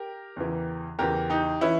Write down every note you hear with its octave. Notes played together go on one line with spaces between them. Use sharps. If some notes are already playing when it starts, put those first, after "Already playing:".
Already playing: G4 A#4
E2 C#3 E3
E2 C#3 E3 G4 A#4
D#4 G4
E3 C#4 E4